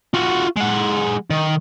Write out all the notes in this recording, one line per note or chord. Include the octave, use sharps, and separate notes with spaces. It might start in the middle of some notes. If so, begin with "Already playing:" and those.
F4 F#4
G#3 F#5
D#3